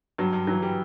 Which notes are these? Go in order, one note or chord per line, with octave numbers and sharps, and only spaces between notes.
G2 F#3
G2
E3 F#3
G3